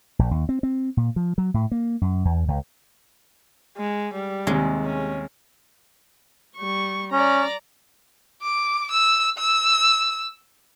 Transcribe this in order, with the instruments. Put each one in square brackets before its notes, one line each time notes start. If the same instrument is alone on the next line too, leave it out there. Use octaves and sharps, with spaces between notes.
[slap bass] A#1
D#2
C4
C4
A#2
F3
F#3
A2
A#3
F#2
E2
C#2
[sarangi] G#3
G3
[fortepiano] D#2 C3 [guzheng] G#3
[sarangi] C#4
[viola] G3 C#6
[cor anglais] C#4 [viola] D5 A#5
[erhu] D6
E6
E6